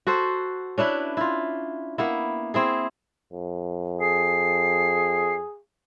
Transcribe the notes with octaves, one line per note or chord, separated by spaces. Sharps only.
F#4 A4 C5
C#4 D4 E4 B4
E4 F4
A#3 B3 E4
C4 E4 G#4
F2
G#4 C7